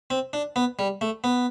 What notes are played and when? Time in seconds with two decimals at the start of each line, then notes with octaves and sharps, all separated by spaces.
0.10 C4
0.33 D4
0.56 B3
0.79 G3
1.01 A3
1.24 B3